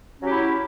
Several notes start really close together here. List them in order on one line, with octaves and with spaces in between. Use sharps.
C#4 F#3 G4 E4